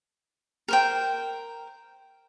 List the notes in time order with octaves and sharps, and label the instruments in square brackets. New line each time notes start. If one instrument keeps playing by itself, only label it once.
[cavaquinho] A#4 C5 G5